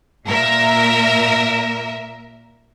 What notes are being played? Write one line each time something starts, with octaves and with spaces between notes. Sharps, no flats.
A#2 A#4 E5